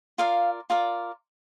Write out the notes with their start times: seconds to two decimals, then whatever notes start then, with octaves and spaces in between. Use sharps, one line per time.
0.18 F4 A#4 D5 F5
0.70 F4 A#4 D5